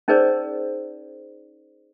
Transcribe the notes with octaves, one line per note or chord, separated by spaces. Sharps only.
C#4 D#4 G#4 A#4 C5 D5